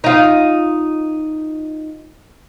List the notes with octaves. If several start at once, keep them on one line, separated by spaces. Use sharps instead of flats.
D#4 F4